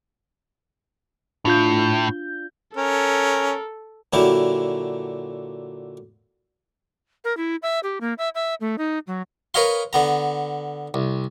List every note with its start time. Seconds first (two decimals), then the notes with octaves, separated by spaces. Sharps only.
1.45 A2 D4 F4 G6
2.77 C#4 A4 A#4
4.13 A#2 D3 F#3 E4 G4
7.24 A#4
7.37 E4
7.62 E5
7.83 G4
8.01 A#3
8.18 E5
8.35 E5
8.61 A3
8.78 D#4
9.07 F#3
9.54 A#4 B4 C#5 D#5 F5 C6
9.93 D3 B3 A#5
10.94 C2